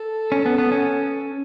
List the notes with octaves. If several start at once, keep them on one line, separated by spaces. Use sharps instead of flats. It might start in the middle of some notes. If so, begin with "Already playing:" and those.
Already playing: A4
C#4
B3
B3
C#4